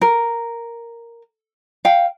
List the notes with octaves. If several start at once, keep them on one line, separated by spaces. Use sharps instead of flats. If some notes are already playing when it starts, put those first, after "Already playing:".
A#4
F5 G5